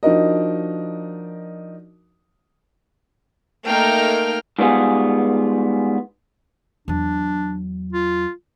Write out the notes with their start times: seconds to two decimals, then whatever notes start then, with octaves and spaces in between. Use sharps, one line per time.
0.03 F3 D4 D#4 F#4 A#4 D#5
3.66 A3 A#3 D#4 A#4 G5 F6
4.59 G#2 G3 B3 F4 G#4
6.88 E2 F#3 D4
7.93 F4